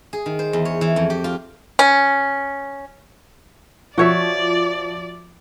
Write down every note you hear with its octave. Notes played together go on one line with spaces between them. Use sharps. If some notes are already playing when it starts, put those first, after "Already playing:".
G#4
D#3
C5
E2
C#5
E3
F2
G4
F4
C#4
F3 F#4 C#5 D5 E5